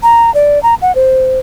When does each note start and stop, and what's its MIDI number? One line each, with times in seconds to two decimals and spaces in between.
0.03 0.33 82
0.34 0.61 74
0.63 0.75 82
0.82 0.94 78
0.95 1.40 72